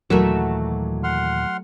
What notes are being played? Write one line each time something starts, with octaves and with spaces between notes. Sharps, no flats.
D#2 A#2 E3 F#3 A3 F#4 A#4 E5
F#5 C6 F6